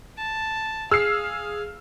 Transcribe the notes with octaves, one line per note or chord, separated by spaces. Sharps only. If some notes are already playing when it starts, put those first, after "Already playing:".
A5
G#4 F5 E6 F6 C7